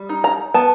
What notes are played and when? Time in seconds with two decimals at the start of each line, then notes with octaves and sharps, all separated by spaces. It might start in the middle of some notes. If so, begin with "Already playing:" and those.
Already playing: G3
0.09 D#4
0.24 A#5
0.54 B3 A5